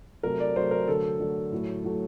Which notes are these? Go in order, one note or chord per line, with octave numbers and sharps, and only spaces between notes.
C3 F#3 A3 A#4
D5
C3 F#3 A3 C5
A#4
D3 F#3 A3 A4
D3 F#3 A3
A2 F#3 A3
A2 F#3 A3